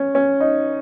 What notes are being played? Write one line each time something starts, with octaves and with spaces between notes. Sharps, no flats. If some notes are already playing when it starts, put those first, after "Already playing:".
Already playing: C#4
C#4
D#4